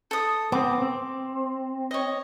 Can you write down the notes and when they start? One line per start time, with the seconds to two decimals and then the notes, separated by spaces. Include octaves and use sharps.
0.11 A4 D#6
0.52 B3 C4 D6
0.82 C4
1.91 C#5 D#5